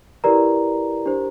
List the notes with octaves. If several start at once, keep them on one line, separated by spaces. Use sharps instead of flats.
E4 G4 A#4 B4 D5 A#5
D4 G4 C5